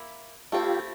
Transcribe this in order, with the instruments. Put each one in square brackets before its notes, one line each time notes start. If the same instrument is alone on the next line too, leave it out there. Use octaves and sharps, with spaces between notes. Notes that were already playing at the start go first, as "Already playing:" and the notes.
Already playing: [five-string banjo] A#3 E4
[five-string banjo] A3 C4 E4 [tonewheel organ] F4 G4